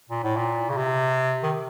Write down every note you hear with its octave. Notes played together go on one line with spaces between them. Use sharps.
A#2
A2
A#2
C#3
C3
D#3